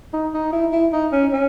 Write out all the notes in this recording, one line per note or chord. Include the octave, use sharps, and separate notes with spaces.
D#4
D#4
E4
E4
D#4
C#4
C#4